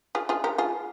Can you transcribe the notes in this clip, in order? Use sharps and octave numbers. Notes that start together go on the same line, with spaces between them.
F4 G#4
F4 G#4
G4 A#4
F4 G#4